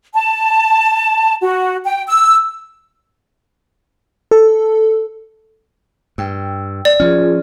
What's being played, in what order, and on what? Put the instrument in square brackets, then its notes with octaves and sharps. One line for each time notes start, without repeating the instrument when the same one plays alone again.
[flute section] A5
F#4
G5
E6
[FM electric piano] A4
[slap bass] G2 [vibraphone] G5 E6
[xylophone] D5
[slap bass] F3 C#4 [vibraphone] F4 G#4